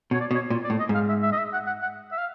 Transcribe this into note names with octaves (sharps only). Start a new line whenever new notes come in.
B2 C#5
D5
B2
C#5
A#2
D5
A2
D#5
G#2
F5
E5
E5
D#5
E5
F#5
F#5
F#5
E5
F5